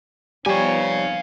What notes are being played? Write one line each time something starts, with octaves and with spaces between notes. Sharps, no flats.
F3 G3 B3 D#4 G4 C#5 F5 G#5